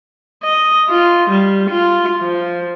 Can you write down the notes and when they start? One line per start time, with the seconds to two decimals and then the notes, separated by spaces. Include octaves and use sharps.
0.43 D#5
0.89 F4
1.30 G3
1.70 F4
2.21 F3